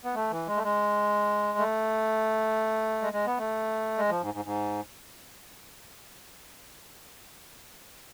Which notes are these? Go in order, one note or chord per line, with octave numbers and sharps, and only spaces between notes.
B3
A3
E3
G#3
A3
G#3
A3
G#3
G#3
B3
A3
G#3
F3
G#2
G#2
G#2